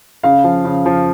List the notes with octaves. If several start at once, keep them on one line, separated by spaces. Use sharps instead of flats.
C#3 F5
F3
C#3
F3